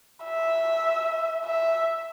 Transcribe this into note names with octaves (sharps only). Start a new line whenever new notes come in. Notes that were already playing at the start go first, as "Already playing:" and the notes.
E5
E5